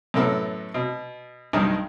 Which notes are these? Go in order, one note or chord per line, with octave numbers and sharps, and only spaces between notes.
F#2 A2 B3 A4 A#4
B2
B1 G2 D#3 D#4 A#4 A5